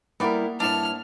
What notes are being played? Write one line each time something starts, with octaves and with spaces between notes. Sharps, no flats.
G3 A#3 B3 E4 A#4 D5 F#5
G2 D4 E4 C#5 A5 F6